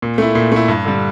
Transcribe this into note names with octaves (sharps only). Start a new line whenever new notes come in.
A#2
A3 E4
A#2
A3 E4
G2
D3 G3